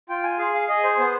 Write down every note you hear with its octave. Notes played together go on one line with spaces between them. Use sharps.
F4 G5
G#5
G#4 F5
F5
G#4 D#5
C5
B3 C5